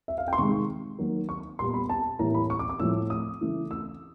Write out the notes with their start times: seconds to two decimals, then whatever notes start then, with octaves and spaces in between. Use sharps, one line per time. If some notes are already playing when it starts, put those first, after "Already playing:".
0.08 E5
0.18 F5
0.28 G5
0.33 C6
0.38 C3 D#3 G#3 C#6
0.99 D#3 F#3 A#3
1.29 C#6
1.59 A#2 G3 B3 C6
1.74 B5
1.89 A5
2.19 A2 E3 G3 A#3 A#5
2.34 B5
2.50 C#6
2.59 D6
2.69 D6
2.80 A2 F3 A3 E6
3.10 D#6
3.41 C#3 E3 A3
3.71 E6